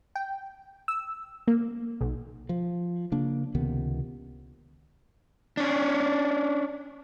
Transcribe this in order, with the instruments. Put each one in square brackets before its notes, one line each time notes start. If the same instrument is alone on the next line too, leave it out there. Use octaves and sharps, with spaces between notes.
[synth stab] G5
E6
A#3
B1
[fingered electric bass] F3
C#3 A#3 D4
C#2 C3 D#3 B3
[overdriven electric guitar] C#4 D4